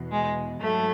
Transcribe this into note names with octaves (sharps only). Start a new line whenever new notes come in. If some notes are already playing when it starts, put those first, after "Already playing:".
Already playing: E2 B2
G#3
G#2 F#3 A3